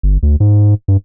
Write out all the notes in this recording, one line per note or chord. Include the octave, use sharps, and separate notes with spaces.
G1
D2
G#2
G2